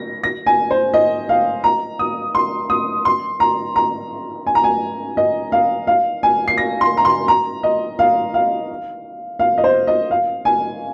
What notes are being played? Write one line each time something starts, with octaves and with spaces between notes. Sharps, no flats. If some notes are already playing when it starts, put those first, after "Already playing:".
Already playing: A#6
A#6
G#5
C5
D#5
F5
A#5
D#6
C6
D#6
C6
A#5
A#5
G#5
A#5
G#5
D#5
F5
F5
G#5
C7
A#6
C6
A#5
C6
A#5
D#5
F5
F5
F5
D#5
C5
D#5
F5
G#5